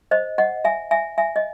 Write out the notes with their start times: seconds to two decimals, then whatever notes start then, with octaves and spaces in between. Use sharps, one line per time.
0.11 C5 D#5
0.38 D#5 F#5
0.64 E5 G#5
0.91 E5 G#5
1.18 E5 G#5
1.36 D#5